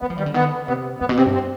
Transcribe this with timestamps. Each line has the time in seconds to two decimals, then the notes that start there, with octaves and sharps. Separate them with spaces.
0.01 G#3 B3
0.10 F3
0.18 D#3 G3
0.26 D3
0.34 D#3 B3
0.42 D3
0.68 C3 B3
1.00 G2 B3
1.09 B2
1.17 C3 C4
1.26 G2
1.34 C4